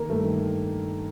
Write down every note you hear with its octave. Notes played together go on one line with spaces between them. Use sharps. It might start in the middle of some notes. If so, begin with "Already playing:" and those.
Already playing: D#3 A#3 A#4
G2 A3 A4
D#3